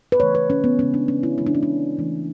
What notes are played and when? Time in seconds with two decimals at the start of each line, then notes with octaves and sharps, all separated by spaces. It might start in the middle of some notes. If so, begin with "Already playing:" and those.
0.12 B4
0.20 C#3 E3 A3 C#5
0.35 B4
0.50 C#4
0.64 B3
0.79 C#3 G#3 C#4
0.94 D4
1.08 C#4
1.23 E4
1.38 C#3 E3 G#3 E4
1.46 D4
1.55 C#4
1.63 D4
1.97 C#3 E3 A3